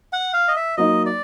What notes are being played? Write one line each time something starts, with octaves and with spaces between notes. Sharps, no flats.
F#5
F5
D#5
E5
F#3 A#3 D#4 D#5
D5